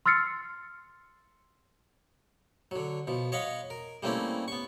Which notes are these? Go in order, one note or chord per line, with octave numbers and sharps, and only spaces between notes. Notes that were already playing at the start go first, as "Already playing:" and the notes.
C6 E6 F6 A6 C7 C#7
D3 F#3
B2 F3
C#5 D#5 F5 F#5 B5
A#4
G3 A3 A#3 C4 C#4 E4
B3 C#6